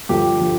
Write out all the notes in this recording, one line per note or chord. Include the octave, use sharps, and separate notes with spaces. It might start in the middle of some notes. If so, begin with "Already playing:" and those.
G2 D3 F3 G4
D3 F3